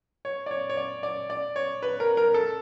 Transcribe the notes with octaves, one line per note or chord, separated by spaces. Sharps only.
C#5
D5
C#5
C#5
D5
D5
D5
C#5
B4
A#4
A#4
A4